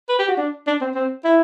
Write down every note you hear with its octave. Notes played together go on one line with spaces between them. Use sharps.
B4
G4
F#4
D4
D4
C4
C4
E4